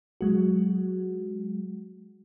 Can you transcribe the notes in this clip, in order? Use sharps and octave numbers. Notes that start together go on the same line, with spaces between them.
F#3 G#3 F#4